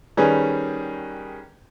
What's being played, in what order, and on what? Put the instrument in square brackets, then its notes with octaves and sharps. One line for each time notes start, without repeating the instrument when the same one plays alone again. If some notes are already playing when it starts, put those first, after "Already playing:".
[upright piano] D#3 G3 C#4 G#4 B4